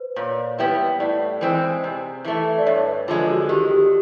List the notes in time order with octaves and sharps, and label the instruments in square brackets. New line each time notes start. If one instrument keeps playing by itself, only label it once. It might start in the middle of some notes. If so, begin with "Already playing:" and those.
Already playing: [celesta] B4 C5
[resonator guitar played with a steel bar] A#2 [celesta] C#5
[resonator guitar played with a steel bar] G3 B3 E4 G4
[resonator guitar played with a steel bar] A2 [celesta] D5
[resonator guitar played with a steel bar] E3 G#3 C4
C3
E3 A3
[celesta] D5
[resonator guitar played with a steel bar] G2 [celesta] C#5
[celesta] B4
[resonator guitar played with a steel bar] D3 F3 G#3 [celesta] F4
[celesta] F#4
[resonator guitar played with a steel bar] D#3 [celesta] G4
[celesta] G4